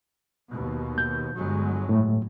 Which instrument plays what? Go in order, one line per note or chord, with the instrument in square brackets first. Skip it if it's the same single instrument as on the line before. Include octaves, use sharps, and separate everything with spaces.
[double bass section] D#2 B2
[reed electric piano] G6
[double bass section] G1 F#3 G#3
[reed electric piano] A2 A3